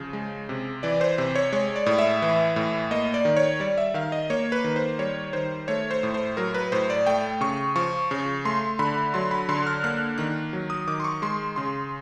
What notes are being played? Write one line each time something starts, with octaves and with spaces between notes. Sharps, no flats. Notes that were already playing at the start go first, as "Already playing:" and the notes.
Already playing: C#3 F3
G#3
C3
E3 D5
C5
C3 C5
C#5
G#3 C#5
D5
A2
E5
E3
A2
A#3 D#5
D5
D#3
C#5
G3 D5
E5
D#3 F5
D#5
A#3 C#5
B4
D#3
C5
G3 C#5
D#3 C5
A3 C#5
C5
A2
C5
F#3 A#4
B4
A2 C5
D5
A3 G5
C#3 C#6
F3 C#6
C#3
A3 C6
D3 B5
F#3 C6
B5
D3 C6
F6
A#3 F#6
D#3 F#6
F#3
D#6
D#3 D6
C6
C#6
G#3 C6
C#3 C6